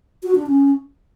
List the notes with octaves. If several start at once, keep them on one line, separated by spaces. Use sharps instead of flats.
F#4
D4
C#4